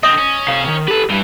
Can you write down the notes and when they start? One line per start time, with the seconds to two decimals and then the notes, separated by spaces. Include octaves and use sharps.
0.03 D3 C4 D#5
0.18 C#4
0.48 C3 F5
0.68 D#3
0.88 G4 A4 B4
1.10 G2 E3